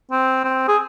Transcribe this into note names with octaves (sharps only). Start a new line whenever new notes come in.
C4
C4
G#4